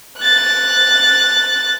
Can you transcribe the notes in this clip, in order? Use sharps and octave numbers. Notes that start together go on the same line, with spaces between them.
F#6 A6